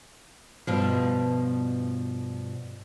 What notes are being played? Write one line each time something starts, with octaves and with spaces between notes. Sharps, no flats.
G2 B2 F3